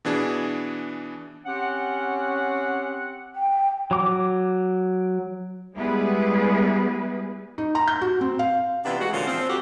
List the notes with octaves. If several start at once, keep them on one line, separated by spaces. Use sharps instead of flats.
B2 E3 D4 G#4
C4 C#4 G4 F#5
G5
F#3 D6
G3 G#3 B3 E4 G#4 B4
D#4
A#5
G6
F#4
C4
F5
C3 E3 B3 D4 E4 F4
G#3 F#4
A#2 D3 E3 F3 C#4 F4
F3 C4
F2 F#4 G4